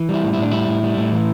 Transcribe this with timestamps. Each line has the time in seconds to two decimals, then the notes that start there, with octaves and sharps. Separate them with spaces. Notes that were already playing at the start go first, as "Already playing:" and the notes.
Already playing: E3
0.09 G3 E4
0.23 A2
0.33 E4
0.38 A2 D4
0.51 G3 E4
0.68 A2
0.83 G3
0.98 A2
1.12 E3